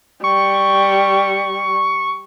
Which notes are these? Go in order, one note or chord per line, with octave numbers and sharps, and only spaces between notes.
G3 C#6